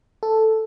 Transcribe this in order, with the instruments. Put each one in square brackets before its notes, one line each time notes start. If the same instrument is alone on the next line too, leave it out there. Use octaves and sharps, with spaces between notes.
[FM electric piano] A4